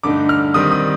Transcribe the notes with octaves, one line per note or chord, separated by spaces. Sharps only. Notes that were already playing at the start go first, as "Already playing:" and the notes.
G2 D3 A3 D#4 D6
F6
D#3 G3 C4 D#4 D#6
D#6